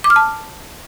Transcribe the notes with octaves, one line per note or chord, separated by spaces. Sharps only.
D6
F6
A5